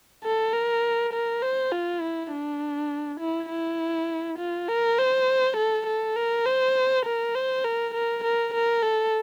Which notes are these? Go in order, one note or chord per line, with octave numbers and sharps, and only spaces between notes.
A4
A#4
A#4
C5
F4
E4
D4
E4
E4
F4
A#4
C5
A4
A4
A#4
C5
A#4
C5
A#4
A#4
A#4
A#4
A4